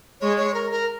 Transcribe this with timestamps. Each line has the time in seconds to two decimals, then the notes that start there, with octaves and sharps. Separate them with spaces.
0.21 G#3 C#5
0.37 C#5
0.54 A#4
0.71 A#4